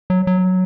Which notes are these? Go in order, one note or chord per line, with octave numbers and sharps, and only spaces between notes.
F#3
F#3